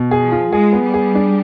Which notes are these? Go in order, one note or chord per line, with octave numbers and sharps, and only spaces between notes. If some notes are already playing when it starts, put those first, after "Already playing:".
Already playing: B2
G#4
F3
F4
G#3 G#4
B3
G3
G#4
D4